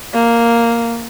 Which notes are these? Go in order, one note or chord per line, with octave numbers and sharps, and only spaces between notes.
A#3